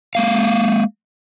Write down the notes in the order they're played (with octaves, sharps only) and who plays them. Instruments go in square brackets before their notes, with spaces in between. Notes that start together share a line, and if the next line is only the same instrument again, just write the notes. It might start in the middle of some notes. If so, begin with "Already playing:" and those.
[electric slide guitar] G#3 A#3 F5